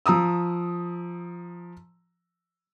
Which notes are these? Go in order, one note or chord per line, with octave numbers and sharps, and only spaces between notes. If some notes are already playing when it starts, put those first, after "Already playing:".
F3 A#5 D#6 E6